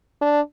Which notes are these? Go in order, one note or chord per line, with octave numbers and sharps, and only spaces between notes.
D4